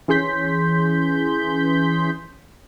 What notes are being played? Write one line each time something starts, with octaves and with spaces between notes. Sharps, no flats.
E3 C#4 G#4 C6 G6 B6